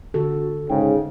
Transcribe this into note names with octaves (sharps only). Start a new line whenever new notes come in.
D3 F#4 A4
G#2 C#3 G5